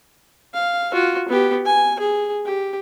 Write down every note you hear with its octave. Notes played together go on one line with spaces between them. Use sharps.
F5
F4 F#4
B3 G4
G#5
G#4
G4